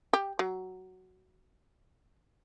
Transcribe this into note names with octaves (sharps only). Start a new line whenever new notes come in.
G4
F#3